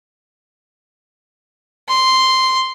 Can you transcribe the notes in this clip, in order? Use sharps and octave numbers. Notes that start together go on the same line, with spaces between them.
C6